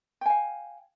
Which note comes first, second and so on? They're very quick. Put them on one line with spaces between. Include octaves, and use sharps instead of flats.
G5 G#5 F5